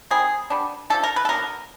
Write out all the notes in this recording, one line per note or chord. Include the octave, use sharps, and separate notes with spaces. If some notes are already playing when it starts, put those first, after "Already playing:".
D#3 G3 C4 G#4
G3 B3 D4
F3 A3 D4 A4
A#4
B4
A4
D3 F#3 B3 A#4